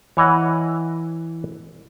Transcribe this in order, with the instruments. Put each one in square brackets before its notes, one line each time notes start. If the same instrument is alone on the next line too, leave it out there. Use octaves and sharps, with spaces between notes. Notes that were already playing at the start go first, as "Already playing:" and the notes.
[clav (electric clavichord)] E3 C#5 D#5 F#5